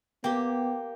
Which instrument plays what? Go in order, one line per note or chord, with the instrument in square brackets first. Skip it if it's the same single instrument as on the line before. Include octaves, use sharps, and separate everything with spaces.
[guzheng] A#3 G4 [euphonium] B3 [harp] G5